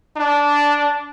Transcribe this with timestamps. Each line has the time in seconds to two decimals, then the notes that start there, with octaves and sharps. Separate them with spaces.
0.17 D4